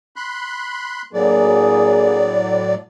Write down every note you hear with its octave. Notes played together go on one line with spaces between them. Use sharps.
B5 C6 F#6
A2 F#3 A#3 D4 G#4 D5